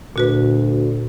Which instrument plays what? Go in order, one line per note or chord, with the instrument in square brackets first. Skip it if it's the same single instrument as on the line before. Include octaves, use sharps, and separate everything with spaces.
[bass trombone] D2 [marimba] A#2 F#4 B4